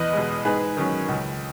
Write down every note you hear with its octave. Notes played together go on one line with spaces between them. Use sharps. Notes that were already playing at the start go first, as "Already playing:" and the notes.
Already playing: E2 B4 D#5
B2 G#3
G#2 G#4 B4
D#3 F#3 C#4
C#2